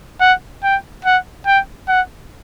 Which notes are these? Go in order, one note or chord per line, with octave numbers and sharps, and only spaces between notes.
F#5
G5
F#5
G5
F#5